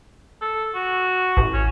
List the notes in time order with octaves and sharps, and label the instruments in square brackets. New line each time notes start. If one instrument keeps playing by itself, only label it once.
[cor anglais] A4
F#4
[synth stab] A1
[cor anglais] C#4